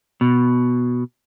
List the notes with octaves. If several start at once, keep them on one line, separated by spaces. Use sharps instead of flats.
B2